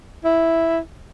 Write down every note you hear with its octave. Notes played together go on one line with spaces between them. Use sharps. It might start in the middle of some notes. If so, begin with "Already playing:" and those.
E4